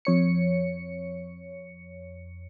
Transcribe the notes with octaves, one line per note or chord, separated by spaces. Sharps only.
F2 C#5 C#7